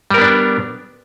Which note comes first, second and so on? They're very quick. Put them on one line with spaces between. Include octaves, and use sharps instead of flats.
G3 A#4 B3 D4